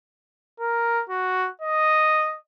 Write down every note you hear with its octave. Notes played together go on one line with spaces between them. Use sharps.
A#4
F#4
D#5